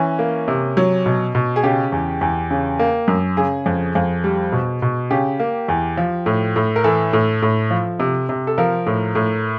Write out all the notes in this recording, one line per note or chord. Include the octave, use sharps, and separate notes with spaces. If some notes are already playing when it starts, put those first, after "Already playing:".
Already playing: E3 C#4
A#3
C3
F#3
B2
B2
G#4
C#3 G4
E2
E2
C#3
A#3
F#2
C#3 G#4
F2
F2
G3
B2
B2
C#3 G4
A#3
E2
F3
A2
A2
A#4
E3 A4
A2
A2
F3
C3
C3
A4
F3 A#4
A2
A2